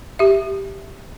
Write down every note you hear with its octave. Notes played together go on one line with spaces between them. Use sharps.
G4 E5